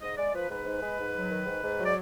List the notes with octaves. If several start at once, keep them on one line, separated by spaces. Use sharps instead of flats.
G#2 D#5
G#3 D5
F3 B4
G#2 B4
G#2
G#3
G#2
F#3
D#3
G#2
G#2
F#3
D5